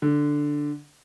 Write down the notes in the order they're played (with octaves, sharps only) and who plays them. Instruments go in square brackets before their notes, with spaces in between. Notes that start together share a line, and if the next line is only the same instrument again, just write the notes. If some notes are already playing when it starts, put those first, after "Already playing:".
[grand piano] D3